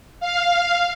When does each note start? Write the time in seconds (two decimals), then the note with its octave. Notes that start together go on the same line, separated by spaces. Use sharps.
0.20 F5